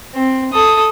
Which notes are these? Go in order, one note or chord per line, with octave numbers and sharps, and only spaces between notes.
C4
A4 D#6